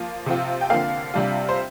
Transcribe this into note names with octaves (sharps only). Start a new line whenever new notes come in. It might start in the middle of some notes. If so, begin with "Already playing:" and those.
Already playing: F3 A#3 F4
C3 F3 C4 F4
G5
D3 F3 A#3 F5
C3 G3 D4 F4
C5